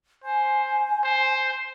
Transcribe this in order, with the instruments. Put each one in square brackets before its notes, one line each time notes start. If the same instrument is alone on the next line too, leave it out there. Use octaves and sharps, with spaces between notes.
[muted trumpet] C5 [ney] G#5
[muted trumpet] C5